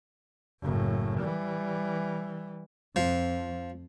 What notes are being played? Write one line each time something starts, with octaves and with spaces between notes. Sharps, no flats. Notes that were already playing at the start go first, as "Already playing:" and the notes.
F#1 A2
E3 G3
F2 F3